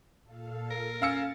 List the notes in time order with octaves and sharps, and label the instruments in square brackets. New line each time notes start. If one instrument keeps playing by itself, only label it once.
[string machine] A#2 A4 F5
[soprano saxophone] A#4 [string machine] A6
[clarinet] C#4 [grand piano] F5 E6 C#7